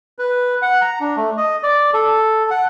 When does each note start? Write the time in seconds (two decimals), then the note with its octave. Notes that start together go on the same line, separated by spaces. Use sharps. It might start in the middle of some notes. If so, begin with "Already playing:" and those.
0.19 B4
0.62 F#5
0.81 A#5
1.00 D4
1.17 A3
1.37 D#5
1.63 D5
1.94 A4
2.50 F#5